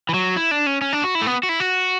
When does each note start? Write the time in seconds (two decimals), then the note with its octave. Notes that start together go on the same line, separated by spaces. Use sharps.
0.09 E3
0.14 F#3
0.36 E4
0.51 D4
0.67 C#4
0.81 C#4
0.93 D4
1.04 F#4
1.15 E4
1.22 A3
1.26 B3
1.43 F#4
1.49 E4
1.60 F#4